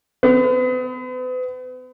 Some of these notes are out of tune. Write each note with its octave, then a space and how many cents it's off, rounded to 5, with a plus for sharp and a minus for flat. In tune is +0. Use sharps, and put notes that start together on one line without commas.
B3 +40